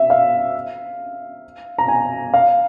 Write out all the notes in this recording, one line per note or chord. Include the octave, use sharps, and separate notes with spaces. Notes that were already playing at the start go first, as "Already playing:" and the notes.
Already playing: E5
F5
A#5
G#5
F5